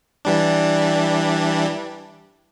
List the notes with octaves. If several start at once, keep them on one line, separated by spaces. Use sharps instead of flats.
E3 G3 D4